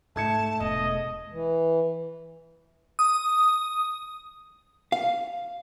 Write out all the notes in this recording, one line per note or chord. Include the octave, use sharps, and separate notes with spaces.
G#2 A3 A5 G#6 C#7
E1 B3 D#5
E3
D#6
F5